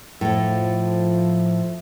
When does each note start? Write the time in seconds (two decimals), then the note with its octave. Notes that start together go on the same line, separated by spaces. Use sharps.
0.21 A2 F3 A4